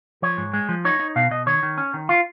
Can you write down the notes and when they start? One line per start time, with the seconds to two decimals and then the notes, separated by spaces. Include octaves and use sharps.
0.22 F3 C#5
0.38 G#2
0.54 G#3
0.69 F3
0.85 D#4 C#5
1.00 D#4
1.16 B2 F5
1.31 B2 D#5
1.46 D#3 C#5
1.63 D#3
1.78 C#4
1.94 D#3
2.09 F4